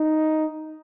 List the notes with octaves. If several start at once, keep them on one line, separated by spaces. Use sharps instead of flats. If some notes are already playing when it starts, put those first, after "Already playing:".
Already playing: D#4